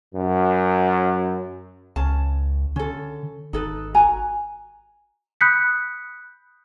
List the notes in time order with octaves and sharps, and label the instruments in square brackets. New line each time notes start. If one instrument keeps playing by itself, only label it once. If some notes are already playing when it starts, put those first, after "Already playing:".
[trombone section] F#2
[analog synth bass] C#2 [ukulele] C#4 A5
[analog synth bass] D3 [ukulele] C#4 A4
[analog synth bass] G#1 [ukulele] D#4 A4 B4
[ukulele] F#4 G#5 A#5
[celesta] B5 D#6 F#6 G6 B6 C#7